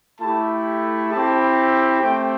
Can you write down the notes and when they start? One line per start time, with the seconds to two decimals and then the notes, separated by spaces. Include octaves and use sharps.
0.20 A3 E4 G4 A5
1.12 C4 E4 G4 A5
2.02 A3 C4 G4 G5